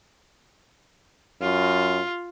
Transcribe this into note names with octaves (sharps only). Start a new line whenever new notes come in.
F#2 F4